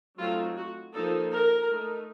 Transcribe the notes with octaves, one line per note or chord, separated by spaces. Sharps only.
F#3 A3 C4 D#4 F4
F#4
F3 A#3 D#4 A4
A#4
A3 D#4